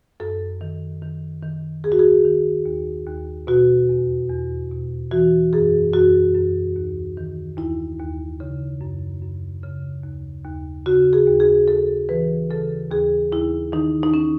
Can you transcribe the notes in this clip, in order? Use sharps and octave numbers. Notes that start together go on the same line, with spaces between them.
F#2 A4
D#3
D#3
D#3
D#2 G#4
F#4
G#4
D#3
D#2
D#2
B2 F#4
E2
E2
B2
E3 F#4
F#2 G#4
F#2 F#4
F#2
D#2
D#3
D#2 E4
D#2
C#3
F#2
F#2
C#3
D#2
D#2
C#3 F#4
G#4
D#2
G#4
D#2 A4
E3 B4
C#3 A4
D#2 G#4
D#2 E4
D#3 D#4
D#4
C#4